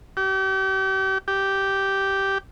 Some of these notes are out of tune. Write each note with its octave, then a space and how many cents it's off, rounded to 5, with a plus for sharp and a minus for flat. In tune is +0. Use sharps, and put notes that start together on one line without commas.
G4 -40
G4 -10